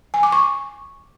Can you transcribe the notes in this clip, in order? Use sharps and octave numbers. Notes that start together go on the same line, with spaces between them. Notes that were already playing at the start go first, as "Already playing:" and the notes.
G#5
D6
C#6